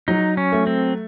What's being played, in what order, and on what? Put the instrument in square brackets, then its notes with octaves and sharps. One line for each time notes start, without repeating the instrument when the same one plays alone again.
[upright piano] F#3 [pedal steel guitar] D#4
[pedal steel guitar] C#4
[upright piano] A3
[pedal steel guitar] C4